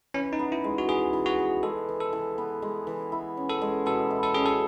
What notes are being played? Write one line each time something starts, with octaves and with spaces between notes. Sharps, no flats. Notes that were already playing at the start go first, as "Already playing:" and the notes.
E3 C#4
D#4
B3
E4
G#3
F#4
E3 G#4
E3
F#4
B3
G#3 A4
E3
A4
E3
B3
G#3
E3
E4
C#4
A4
G#3
B2 A4
E4
A4
C#4 G#4
A4